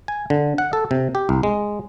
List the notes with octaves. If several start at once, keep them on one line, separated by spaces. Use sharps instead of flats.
G#5
D3
F#5
A4
C3
G4
C2
G#3